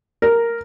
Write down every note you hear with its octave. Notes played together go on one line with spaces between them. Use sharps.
A#4